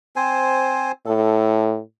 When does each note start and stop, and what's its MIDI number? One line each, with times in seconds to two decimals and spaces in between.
0.16 0.92 60
0.16 0.92 72
0.16 0.92 80
1.06 1.80 45
1.06 1.64 69